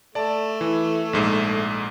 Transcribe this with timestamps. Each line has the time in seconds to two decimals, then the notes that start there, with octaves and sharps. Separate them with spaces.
0.15 A3 D5 A5
0.61 E3
1.13 A#1 G#2